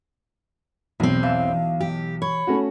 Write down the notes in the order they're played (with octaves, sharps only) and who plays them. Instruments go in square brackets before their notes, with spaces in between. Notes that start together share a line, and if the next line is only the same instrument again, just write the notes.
[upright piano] B1 [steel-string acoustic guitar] E2 C4
[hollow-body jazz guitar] E3 E5 [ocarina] F5
[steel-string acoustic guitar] G4
[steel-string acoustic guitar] C#5 [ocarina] B5
[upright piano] A3 C#4 F#4